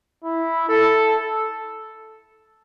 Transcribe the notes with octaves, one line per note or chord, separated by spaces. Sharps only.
E4
A4